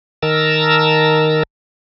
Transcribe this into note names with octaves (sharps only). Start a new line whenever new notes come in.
D#3 A#4 A5 A#5 E6